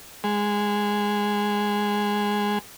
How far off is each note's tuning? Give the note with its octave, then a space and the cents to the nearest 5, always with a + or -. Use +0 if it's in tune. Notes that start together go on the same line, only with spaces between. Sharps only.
G#3 -10